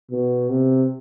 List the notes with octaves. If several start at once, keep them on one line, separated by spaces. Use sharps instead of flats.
B2
C3